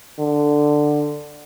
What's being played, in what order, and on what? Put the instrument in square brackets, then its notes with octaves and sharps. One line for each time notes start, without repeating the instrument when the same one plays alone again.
[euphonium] D3